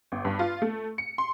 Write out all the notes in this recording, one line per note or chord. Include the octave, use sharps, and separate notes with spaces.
G1
G2
F4
A3
C#7
C6